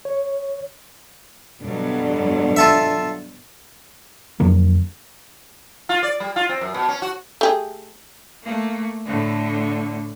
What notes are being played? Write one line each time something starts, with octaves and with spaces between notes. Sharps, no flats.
C#5
G2 B2 D3 F#3
F4 A4 E5
F2 D3 F#3 A#3
F4
D5
G3
F4
C4
F#2
B2
C#4
F#4
A3 G4 G#4
A3 A#3
A2 D3